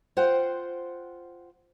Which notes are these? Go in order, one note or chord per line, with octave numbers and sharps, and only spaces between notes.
F4 C5 F#5 G5